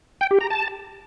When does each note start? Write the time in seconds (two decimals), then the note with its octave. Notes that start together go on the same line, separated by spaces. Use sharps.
0.21 G5
0.31 G4
0.41 A#5
0.50 A5